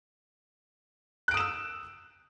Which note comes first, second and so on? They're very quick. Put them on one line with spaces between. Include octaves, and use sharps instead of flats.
F#6 D7 D#6 E7 E6